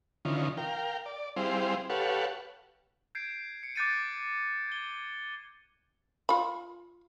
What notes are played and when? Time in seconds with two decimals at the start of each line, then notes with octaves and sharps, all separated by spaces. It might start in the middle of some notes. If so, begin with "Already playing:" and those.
0.25 D3 E3 C#4 D#4 F4
0.57 A#4 F5 G5
1.06 D5
1.36 G3 C4 E4 G#4 C5 F5
1.90 G4 A4 B4 C#5 F5 F#5
3.15 G6 G#6 C7 D7
3.63 C#7
3.76 D6 F#6 G6 A6 C#7 D#7
4.67 G#6 G7
6.29 F4 B5